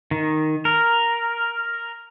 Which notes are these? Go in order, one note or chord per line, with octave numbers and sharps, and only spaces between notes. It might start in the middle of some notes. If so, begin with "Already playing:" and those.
D#3
A#4